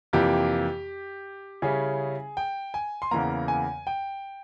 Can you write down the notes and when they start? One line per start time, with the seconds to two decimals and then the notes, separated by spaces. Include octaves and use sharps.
0.13 F2 C3 E3 A#3 G4
1.62 C#3 G3 C#4 E4 G#4
2.37 G5
2.74 G#5
3.02 C6
3.11 E2 C#3 E3 A#3 A#5
3.48 G#5
3.87 G5